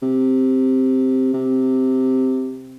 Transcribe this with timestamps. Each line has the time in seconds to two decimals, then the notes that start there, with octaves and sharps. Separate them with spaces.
0.02 C3
1.34 C3